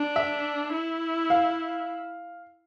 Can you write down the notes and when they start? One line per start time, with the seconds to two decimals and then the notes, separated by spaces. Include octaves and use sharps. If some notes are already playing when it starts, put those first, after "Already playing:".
Already playing: D4
0.16 E5
0.73 E4
1.30 F5